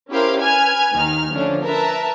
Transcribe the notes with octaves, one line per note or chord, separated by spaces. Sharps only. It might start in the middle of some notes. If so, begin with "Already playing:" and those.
C#4 E4 G4 A#4 C5 F5
B4 G#5 F6 G#6
D#2 D#3 D#4 F6
D3 F3 A3 C#4 D4
A#4 B4 E5 A5